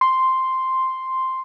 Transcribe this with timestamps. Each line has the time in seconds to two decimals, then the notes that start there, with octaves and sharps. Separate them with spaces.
0.01 C6